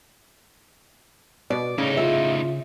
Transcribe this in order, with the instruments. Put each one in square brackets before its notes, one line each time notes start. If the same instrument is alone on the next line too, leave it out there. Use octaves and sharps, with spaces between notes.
[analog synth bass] B2 [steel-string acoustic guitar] D5
[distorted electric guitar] A2 D#4 [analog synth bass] C#3
[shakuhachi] F4 [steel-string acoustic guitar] E5